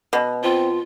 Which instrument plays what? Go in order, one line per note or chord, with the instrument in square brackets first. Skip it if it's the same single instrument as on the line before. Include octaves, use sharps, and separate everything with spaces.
[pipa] B2
[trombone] C4 [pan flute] F4